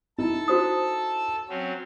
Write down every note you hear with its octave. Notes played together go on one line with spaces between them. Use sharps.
D#4 E4 A4 A5 E6
F#4 C5 D#6
F#3 C4 C#4